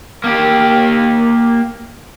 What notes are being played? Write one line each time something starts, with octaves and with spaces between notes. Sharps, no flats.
A#3 G4